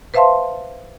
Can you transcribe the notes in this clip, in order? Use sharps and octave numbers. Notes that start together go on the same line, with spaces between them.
B4 C5 E5 F5 A5 C6